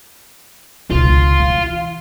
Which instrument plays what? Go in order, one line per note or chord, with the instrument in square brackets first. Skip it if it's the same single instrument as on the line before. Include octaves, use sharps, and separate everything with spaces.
[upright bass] C#2 B2 [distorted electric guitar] F4
[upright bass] E3